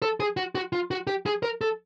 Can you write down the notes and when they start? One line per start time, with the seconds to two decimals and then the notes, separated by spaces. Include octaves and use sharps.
0.02 A4
0.20 G#4
0.37 F#4
0.55 F#4
0.73 F4
0.91 F#4
1.07 G4
1.26 G#4
1.43 A#4
1.61 A4